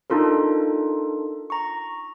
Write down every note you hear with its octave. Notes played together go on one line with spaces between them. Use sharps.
D4 D#4 F4 A4 A#4
A#5 C#6